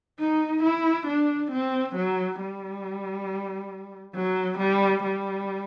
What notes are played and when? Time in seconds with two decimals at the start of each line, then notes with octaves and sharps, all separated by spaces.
0.20 D#4
0.64 E4
1.07 D4
1.52 C4
1.96 F#3
2.40 G3
4.15 F#3
4.59 G3
5.04 G3